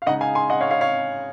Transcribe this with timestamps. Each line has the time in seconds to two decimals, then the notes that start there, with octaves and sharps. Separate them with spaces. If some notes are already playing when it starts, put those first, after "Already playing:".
0.02 F5
0.07 C#3 G#3 D#4 D#5 F#5
0.21 F5 G#5
0.35 G#5 C6
0.50 D#5 F#5
0.61 C#5 F5
0.71 C#5 F5
0.81 C#5 F5